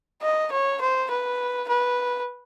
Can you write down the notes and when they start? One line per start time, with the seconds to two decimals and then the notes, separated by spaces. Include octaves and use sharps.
0.22 D#5
0.51 C#5
0.81 C5
1.10 B4
1.68 B4